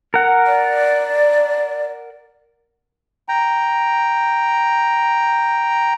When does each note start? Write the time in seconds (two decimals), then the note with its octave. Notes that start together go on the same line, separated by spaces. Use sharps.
0.14 A#4 F#5
0.47 D5
3.29 G5 A#5